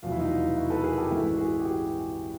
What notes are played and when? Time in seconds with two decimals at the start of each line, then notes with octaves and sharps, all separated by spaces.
0.02 F1 E2 B2 F#3 F4
0.12 E4
0.20 D#4 F4
0.57 E4 F#4
0.70 A4 B4
0.83 G#4 A#4
0.97 G4 A4
1.11 A1 G2 E3 G#3 E4 F#4
1.38 F#4 G#4
1.60 G4
1.65 F#4 G#4